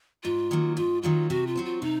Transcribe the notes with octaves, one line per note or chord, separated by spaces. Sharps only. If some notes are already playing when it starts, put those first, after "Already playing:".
G#2 F4
D#3 F#3 A#3
G#2 F4
D#3 F#3 A#3 F4
C3 F#4
F4
F#3 C4 F#4 C5
F4
C3 D#4